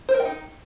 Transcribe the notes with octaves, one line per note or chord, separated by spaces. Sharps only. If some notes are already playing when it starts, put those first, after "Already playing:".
C5
A#4
G5
D#4